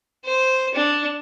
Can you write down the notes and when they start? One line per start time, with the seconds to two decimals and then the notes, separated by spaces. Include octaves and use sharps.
0.25 C5
0.74 D4